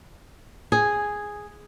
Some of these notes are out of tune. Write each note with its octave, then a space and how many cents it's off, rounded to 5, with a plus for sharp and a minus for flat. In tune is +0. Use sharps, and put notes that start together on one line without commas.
G#4 -5